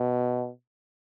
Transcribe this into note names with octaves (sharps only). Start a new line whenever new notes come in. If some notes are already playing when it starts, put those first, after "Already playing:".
Already playing: B2